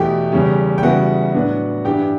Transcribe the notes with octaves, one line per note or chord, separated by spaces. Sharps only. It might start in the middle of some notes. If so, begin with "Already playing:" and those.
Already playing: E2 B2 A3 E4 G4 G5
E2 C#3 G3 C#4
G5
E2 C#3 G3 B3 E4 F#4 F#5
A2 F#3 B3 D4
G2 E3 G3 D4 G4 G5